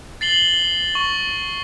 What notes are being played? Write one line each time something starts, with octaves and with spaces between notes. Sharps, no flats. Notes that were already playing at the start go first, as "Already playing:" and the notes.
A6 C7 F#7 G7
C#6